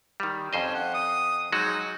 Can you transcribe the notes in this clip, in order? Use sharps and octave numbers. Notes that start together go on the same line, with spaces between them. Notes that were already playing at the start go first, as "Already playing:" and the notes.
D#3 G3
F2 C#4 C5 D#5
F#5
D#6
F#3 G#3 D#4 F#4